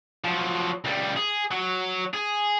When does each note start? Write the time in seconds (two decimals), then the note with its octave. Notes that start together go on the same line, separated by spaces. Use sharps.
0.25 F3 F#3
0.85 C#2 G3
1.16 G#4
1.51 F#3
2.14 G#4